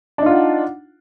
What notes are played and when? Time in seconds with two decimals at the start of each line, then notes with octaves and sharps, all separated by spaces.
0.18 D4
0.22 D#4
0.26 F4
0.30 F#5